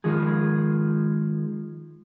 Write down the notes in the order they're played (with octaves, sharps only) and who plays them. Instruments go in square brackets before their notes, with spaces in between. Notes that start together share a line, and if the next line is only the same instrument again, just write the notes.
[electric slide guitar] D#3 F3 G#3 G#4